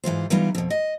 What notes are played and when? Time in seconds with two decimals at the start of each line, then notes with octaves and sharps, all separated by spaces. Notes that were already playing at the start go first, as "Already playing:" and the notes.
0.04 G#2 E3 F4 C5
0.30 E3 G3 B3 D#4 F4
0.55 F2 B2
0.70 D#5